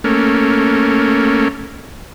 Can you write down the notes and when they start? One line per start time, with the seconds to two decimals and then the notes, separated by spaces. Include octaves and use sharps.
0.04 A3 A#3 C#4